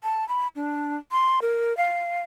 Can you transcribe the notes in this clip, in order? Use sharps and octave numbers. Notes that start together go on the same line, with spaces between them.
A5
B5
D4
C6
A#4
F5